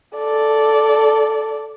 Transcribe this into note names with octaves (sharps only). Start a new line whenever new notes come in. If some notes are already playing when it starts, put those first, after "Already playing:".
A4 D5